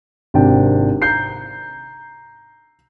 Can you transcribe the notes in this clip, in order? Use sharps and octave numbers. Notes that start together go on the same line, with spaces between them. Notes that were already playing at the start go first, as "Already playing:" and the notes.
G#1 C3 D4 G5
A#5 G6 C7